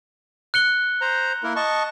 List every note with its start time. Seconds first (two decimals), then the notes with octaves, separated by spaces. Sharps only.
0.54 F#6 C#7 G7
1.01 C5 A#5
1.43 A#3 E4 A#4
1.56 D#5 A5 C#6